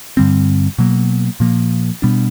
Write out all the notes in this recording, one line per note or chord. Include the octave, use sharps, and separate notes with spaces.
G2 D3 G3 C4
B2 F#3 A#3
A#2 F3 A#3
B2 G3 B3 D4